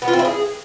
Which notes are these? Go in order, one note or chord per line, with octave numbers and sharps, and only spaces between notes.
B3
F4
C4
E4
G#4